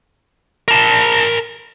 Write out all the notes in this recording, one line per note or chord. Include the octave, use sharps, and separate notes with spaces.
A#4 A5